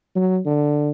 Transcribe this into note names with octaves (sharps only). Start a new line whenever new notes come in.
F#3
D3